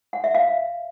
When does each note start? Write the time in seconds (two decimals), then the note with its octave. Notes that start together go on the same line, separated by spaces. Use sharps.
0.13 F#5
0.24 E5
0.35 F5